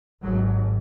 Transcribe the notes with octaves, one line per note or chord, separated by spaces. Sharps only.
G#1 G#2 F#3